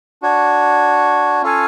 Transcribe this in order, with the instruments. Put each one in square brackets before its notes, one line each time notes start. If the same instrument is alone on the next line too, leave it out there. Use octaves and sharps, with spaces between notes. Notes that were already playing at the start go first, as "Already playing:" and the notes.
[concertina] D4 F#4 C#5
C#4 F4 A4 F5 G#5